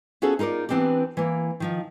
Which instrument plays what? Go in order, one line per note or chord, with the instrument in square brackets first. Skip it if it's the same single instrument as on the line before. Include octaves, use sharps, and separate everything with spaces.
[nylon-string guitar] B3 C#4 F4 F#4 G#4 A4
D#4 F4 A#4 C5 D5
E3 B3 C4 D4 G4
E3 A#3
D#3 F3 D#4